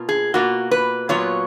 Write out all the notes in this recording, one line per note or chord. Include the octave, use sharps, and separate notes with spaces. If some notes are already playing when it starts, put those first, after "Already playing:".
Already playing: B2 A#3 F4
G#4
B2 A#3 F4 F#4
B4
A#2 F#3 B3 F4 C#5